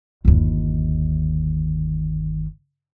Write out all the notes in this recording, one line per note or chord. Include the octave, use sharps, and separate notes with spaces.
G1 D#2